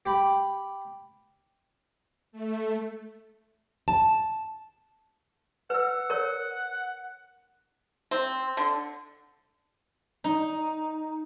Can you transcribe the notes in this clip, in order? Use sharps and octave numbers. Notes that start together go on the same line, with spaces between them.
G4 B5
A3
A5
B4 F#5 E6
A#4 C#5
C4
D3
D#4